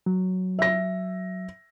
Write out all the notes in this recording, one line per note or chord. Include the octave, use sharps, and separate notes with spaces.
F#3
E5 A#6